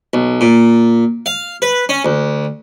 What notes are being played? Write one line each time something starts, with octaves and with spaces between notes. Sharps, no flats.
B1
A#2
F5
B4
C#4
D2